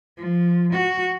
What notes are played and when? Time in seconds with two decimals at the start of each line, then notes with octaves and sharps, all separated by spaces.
0.18 F3
0.74 F#4